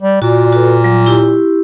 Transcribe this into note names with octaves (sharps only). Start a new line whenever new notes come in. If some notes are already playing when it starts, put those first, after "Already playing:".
G3
A#2 F#4 D5
F#4 A4 B4
F#3 G3
E4 G4